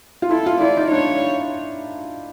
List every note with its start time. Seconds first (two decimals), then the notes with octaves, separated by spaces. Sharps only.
0.22 F4
0.31 E4 A4
0.46 F4
0.61 E4 D5
0.77 D#4
0.92 D4 C#5